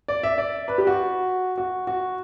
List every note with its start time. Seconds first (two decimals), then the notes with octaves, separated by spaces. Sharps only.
0.08 D5
0.23 E5
0.38 D5
0.68 B4
0.78 G4
0.87 F#4
1.58 F#4
1.87 F#4